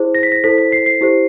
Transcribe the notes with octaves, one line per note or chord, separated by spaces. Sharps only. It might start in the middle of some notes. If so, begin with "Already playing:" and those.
Already playing: E4 G#4 C5
A#6
B6
A#6
E4 A4 C5 B6
B6
C7
C7
E4 G4 C5